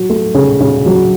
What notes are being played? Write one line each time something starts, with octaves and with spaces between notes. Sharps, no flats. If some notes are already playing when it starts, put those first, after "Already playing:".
Already playing: F#3
A3
C#3
C#3
F#3